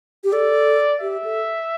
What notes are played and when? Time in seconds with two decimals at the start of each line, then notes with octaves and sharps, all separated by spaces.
0.24 G4
0.33 A4 D5
1.01 G4 E5
1.24 A4